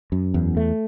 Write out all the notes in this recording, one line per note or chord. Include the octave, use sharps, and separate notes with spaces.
F#2
E2
A3